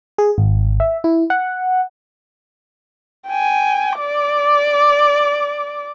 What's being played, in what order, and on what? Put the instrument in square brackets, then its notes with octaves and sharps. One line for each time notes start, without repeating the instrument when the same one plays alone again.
[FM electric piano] G#4
G#1
E5
E4
F#5
[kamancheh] G5 G#5
D5 D6